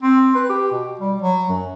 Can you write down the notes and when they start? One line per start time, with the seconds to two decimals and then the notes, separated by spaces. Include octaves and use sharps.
0.02 C4
0.35 B4
0.49 G4
0.71 B2
0.99 G3
1.22 F#3
1.49 F#2